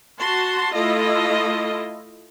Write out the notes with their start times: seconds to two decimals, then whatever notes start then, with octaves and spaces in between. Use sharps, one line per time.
0.19 F#4 A5 C6
0.75 A3 E4 F4 A4 D#5